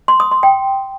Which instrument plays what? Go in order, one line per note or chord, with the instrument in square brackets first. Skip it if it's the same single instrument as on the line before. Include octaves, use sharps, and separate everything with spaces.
[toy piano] C6
D#6
C6
G5